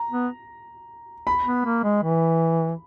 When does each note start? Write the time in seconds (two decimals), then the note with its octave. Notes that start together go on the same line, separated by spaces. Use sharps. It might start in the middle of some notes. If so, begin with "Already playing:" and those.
Already playing: A#5
0.11 B3
1.27 B5
1.45 B3
1.65 A#3
1.84 G#3
2.03 E3